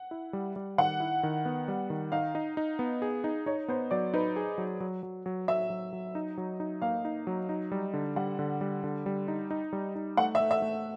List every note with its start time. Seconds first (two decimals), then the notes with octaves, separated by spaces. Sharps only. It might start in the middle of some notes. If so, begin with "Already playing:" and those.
Already playing: F#5
0.11 E4
0.33 G3
0.56 G3
0.78 D#3 F#5
1.00 E4
1.23 D#3
1.45 B3
1.68 G3
1.90 D#3
2.12 D#4 F5
2.35 D#4
2.57 D#4
2.79 B3
3.02 G#4
3.24 D#4
3.46 D#4 C#5
3.68 B3 C5
3.91 F#3 D5
4.14 D#4 B4
4.36 G#4
4.58 F#3
4.80 F#3
5.03 F#3
5.26 F#3
5.48 F#3 E5
5.70 F#3
5.93 F#3
6.15 D#4
6.38 F#3
6.60 D#4
6.82 A#3 F5
7.05 D#4
7.27 F#3
7.49 D#4
7.72 G3
7.94 D3
8.16 G3 F#5
8.39 D3
8.61 G3
8.84 D3
9.06 G3
9.28 D#4
9.51 D#4
9.73 G3
9.95 D#4
10.17 A3 F#5
10.35 E5
10.40 A3
10.51 E5
10.62 A3